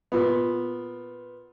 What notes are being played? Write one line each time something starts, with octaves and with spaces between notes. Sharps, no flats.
A#2 B3